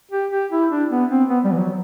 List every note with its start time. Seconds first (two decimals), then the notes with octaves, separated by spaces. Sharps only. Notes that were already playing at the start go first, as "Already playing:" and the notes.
0.12 G4
0.31 G4
0.51 E4
0.71 D4
0.90 B3
1.10 C4
1.29 B3
1.44 G3
1.52 E3
1.59 F#3